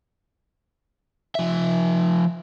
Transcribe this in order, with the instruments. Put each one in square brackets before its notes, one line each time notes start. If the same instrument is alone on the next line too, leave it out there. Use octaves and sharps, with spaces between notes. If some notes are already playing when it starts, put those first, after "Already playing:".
[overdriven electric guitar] F3 E5